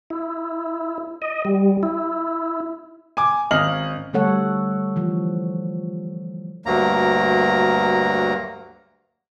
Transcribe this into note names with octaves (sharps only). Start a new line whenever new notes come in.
E4
D#5
G3
E4
G#5 D6
G#1 C#4 D#5 F6 F#7
D3 G3 A3 A4 C#5 F#5
E3 F3
D2 G2 F#3 A#3 A#5